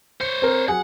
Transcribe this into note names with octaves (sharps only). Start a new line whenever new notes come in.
C5 C#5 C#7
C4 A#4
F#3 G#4 F#5